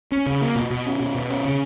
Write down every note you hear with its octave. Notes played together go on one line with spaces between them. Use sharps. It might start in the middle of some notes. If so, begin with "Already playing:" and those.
C#4
C#3
A#3
B2
B2
C#4
B2
B2
C#4
C#3